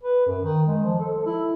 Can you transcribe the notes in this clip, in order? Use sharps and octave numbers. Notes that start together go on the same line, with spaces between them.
B4
F#2
D#3
G#3
F3
A4
E4